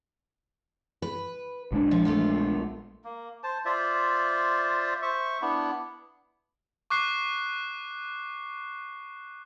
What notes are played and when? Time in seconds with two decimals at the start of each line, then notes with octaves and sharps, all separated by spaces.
1.02 B4
1.72 A#1 G#3 D4
1.91 F3
2.05 A3 B3 F4
3.04 A#3
3.43 C5 A5
3.65 F4 C5 D5 E5
5.02 C5 E5 C#6
5.42 B3 D4 E4
6.90 C#6 D6 F#6 C7